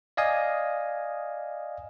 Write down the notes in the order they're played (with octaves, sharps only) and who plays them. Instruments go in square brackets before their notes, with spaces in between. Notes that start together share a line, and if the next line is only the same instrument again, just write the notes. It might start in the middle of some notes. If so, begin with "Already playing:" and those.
[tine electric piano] D5 D#5 F5 G#5 D#6